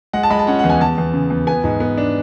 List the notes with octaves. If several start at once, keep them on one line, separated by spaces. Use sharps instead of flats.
G#3 F#5
A5
G#3 B5
A5
C#4 F#5
E2 F#5
G#5
E2 A5
E2
C#3
E2
B3 G#5
G#2
B3
D4